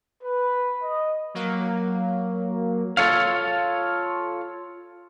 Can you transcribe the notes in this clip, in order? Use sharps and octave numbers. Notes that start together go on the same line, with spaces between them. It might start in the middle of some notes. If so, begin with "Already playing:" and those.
B4
D#5
F#3 A#3
F4 A4 C#5 F5